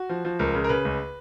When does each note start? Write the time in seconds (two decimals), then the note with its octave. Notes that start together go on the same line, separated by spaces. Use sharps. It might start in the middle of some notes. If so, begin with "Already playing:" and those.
Already playing: F#4
0.10 F3
0.25 F3
0.39 C#2 A#4
0.54 C#3
0.64 A#4
0.69 C#3 B4
0.85 C#2